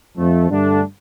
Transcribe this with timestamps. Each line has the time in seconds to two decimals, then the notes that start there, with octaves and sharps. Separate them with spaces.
0.17 F2 F3 A3
0.49 G2 D3 A3 D4